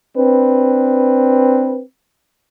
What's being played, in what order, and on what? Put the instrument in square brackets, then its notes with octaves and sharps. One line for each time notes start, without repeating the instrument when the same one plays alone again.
[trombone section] C4 D4 B4